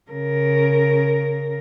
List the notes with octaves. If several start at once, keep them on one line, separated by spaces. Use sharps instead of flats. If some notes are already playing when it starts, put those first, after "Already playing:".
C#3 A#4